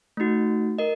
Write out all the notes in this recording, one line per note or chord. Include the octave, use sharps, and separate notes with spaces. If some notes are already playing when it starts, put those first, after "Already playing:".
A3 D#4 F#4
A#4 D#5